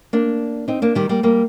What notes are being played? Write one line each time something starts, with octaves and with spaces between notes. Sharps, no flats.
A#3 D4
C4 D#4
A#3 D4
D#3 G3
G3 A#3
G3 A#3